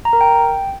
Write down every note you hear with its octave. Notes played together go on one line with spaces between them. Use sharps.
A#5
A#4
G5